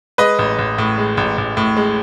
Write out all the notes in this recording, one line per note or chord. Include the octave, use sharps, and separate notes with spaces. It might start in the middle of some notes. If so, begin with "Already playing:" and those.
G#3 B4 D#5
A1
A1
A2
G#3
A1
A1
A2
G#3